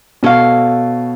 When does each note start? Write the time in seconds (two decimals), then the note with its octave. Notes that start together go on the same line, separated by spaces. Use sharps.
0.23 B2 A4 C#5 F5